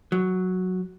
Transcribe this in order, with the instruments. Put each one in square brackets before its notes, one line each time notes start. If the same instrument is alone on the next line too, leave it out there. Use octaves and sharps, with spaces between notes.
[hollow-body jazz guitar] F#3